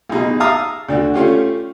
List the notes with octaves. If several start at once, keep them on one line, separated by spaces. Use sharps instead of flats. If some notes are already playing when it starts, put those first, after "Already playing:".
B1 B2 D#4 G#4
E5 F5 A5 A#5 D#6
D2 D4 F#4
A3 C#4 F4 G4